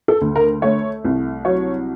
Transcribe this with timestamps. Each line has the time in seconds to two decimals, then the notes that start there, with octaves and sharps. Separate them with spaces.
0.08 A4
0.21 D2
0.36 A#4
0.62 A3 C#5
1.05 C2
1.45 F#3 C#5